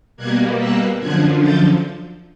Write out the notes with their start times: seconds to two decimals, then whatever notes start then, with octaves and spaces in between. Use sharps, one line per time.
0.17 B2 G3 A#3 F#6 G#6
0.59 E6 F#6
0.99 F#2 D3 F3 F#6 G#6
1.41 G6 A6